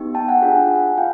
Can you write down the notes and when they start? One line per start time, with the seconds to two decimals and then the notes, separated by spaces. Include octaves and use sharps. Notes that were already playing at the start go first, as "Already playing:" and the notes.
Already playing: B3 D#4 G4
0.15 G5 A5
0.28 F#5 G#5
0.42 D4 F4 G#4
0.98 F4 F5 G5